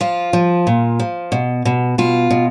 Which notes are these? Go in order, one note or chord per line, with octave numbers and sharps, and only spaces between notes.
F3 F4
F3
A#2
F3
B2
B2
B2 F4
B2